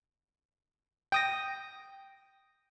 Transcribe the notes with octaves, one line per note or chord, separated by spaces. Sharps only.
G5 D#6 A#6